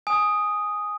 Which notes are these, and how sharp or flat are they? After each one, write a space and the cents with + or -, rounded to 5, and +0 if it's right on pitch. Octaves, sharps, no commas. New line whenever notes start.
G#5 +0 D#6 +0